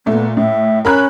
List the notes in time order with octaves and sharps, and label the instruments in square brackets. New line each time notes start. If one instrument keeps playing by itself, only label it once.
[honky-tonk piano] A#2 A3 [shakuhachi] B3
[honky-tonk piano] A2 [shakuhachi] E5
[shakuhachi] C#4 [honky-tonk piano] A#4 B5 F#6